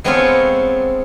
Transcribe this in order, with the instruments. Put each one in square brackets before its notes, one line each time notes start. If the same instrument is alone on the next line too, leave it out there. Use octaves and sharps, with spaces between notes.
[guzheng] G#3 B3 C4 A4 C#5 F5